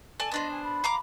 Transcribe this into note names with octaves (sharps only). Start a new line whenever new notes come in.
A4 D5 G#5 A5
B3 D4 C5 D#5
G#5
B5
F5 A#5 D6